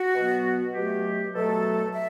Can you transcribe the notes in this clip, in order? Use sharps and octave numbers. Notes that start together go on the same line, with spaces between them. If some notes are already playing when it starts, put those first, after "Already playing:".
Already playing: F#4
B2 F#3 B3
B2 F#3 A3 G4
B2 F#3 A3 A4
E5